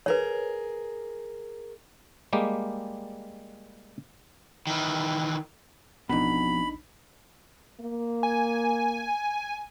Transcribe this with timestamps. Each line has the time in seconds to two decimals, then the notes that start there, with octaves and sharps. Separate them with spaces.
0.06 G#4 A#4 B4 C#5
2.33 G3 G#3 A#3 G4
4.67 D#3 E3
6.09 A1 F2 B2 D4 D#4 B5
7.80 A#3
8.23 G#5